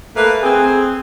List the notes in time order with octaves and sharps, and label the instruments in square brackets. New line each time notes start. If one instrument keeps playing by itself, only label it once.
[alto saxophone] A3 [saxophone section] A#3 B4
[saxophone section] C4 [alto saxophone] G#4